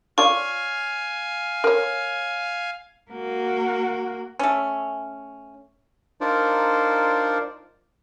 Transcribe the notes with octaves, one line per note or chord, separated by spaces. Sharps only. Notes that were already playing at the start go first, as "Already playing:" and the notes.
F4 C#5 D5 F5 G#5 C#6
A#4 C#5
A#3 F#4
A3 C#4
D4 D#4 F4 A#4 C5 D5